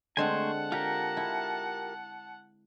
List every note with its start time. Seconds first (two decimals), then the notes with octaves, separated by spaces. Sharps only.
0.17 D3 G#3 A3 C4 C5 F#5 G#5 A5
0.72 F4 G4 A#4 A#5
1.17 E4